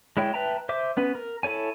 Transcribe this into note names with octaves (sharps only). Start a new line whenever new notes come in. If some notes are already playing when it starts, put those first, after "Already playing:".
G#3 E4 C#5 G5
B4 E5 G5 A5 A#5
C5 E5 D6
B3 C#4 B4
A#4
E4 A4 C#5 G#5